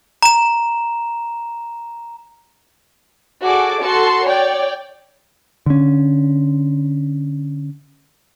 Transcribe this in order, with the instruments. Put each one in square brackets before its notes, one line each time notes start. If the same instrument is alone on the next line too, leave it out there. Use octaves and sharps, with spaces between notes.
[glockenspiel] A#5 E7
[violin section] F#4 G#4 A4 D5 D6
F#4 A4 A5 C6 C#7
C#5 D5 G5
[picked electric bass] D3 C#4